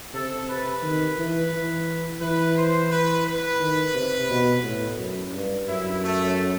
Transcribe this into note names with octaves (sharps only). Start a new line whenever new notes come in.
C3 A4
B4
D#3
E3
E3
E3 B4
C5
B4
B4
D#3
C3
B2
A2
F#2
G2
F#2 E4
A3